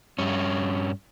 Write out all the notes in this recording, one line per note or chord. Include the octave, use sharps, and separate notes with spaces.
G2 C#4